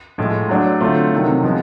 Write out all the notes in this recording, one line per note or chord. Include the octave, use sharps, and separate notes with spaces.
A2 F3 G#3
F#3 A3 D4 F#4
D3 F#3 A3 C4 F4
C3 D#3 F#3
F3 G#3 B3